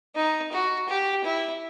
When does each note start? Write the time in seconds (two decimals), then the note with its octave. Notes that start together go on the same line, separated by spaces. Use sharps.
0.15 D#4
0.52 F#4
0.88 G4
1.25 E4